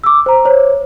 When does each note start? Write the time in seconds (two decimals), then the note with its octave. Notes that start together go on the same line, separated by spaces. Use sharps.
0.04 D6 E6
0.26 C5 A#5
0.45 C5 C#5